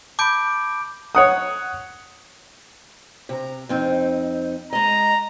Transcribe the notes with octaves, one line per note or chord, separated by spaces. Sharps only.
A5 B5 D6 G6 D7
C#5 F#5 D#6
C3 A#5
F2 C4 D#4
G#3 D#5 A#5